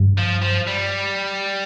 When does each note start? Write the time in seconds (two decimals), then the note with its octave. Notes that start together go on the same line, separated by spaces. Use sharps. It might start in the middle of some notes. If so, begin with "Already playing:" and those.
Already playing: G2
0.18 F3
0.42 F3
0.67 G3